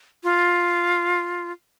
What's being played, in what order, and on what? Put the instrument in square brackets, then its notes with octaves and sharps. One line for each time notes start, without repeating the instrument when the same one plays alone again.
[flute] F4